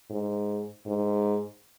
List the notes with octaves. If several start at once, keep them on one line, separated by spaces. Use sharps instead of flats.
G#2
G#2